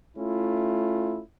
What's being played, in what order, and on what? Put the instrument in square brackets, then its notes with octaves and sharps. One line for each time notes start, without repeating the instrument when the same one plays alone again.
[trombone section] A3 C#4 E4 F4